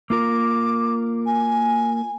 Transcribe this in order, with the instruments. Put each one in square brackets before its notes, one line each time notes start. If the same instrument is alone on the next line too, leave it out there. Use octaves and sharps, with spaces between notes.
[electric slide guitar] A#3 F4 A#4 [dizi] D6
[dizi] G#5